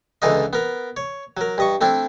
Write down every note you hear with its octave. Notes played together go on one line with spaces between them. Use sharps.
C#2 D3 E3 D#4 F4 D#5
B3 A#4
C#5
F#3 A#4
G2 D#5 C#6
A3 C4 D4 E4